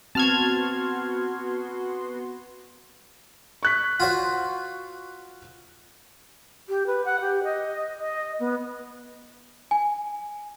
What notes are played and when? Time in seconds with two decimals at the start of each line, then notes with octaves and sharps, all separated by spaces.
0.15 B3 C4 F#4 A5 C6 F6 G#6
3.63 C#6 F#6 B6
4.00 F4 F#4 C5
6.69 G4
6.87 B4
7.05 F#5
7.21 G4
7.44 D#5
7.98 D#5
8.40 B3
9.71 G#5